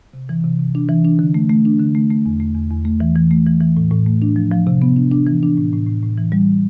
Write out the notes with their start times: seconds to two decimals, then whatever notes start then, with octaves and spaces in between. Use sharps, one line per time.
0.14 C3
0.29 E3
0.44 C3
0.59 C3
0.75 D4
0.89 E3
1.05 D4
1.19 D3
1.34 A3
1.50 A3
1.65 D4
1.80 D3
1.95 A3
2.10 A3
2.26 E2
2.40 A3
2.55 E2
2.70 E2
2.85 A3
3.00 E3
3.16 E3
3.31 A3
3.47 E3
3.61 E3
3.77 A2
3.91 A2
4.06 A3
4.22 D4
4.36 F3
4.52 F3
4.67 C3
4.82 B3
4.96 D4
5.12 D4
5.27 E3
5.43 D4
5.57 A2
5.73 A2
5.87 A2
6.03 A2
6.17 E3
6.32 G3